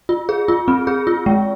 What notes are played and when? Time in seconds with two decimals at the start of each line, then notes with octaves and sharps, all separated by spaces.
0.09 F4
0.29 G#4
0.48 F4
0.68 C4
0.87 G#4
1.07 F4
1.26 G#3